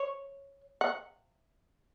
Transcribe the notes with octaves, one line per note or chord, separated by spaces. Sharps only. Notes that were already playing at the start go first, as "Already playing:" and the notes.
Already playing: C#5
F#5